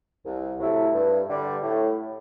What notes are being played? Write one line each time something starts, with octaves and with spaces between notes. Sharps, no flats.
C2
C3 F#3 A3 E4
G2
D3 G3
A2